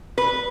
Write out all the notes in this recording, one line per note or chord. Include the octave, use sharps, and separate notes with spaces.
B4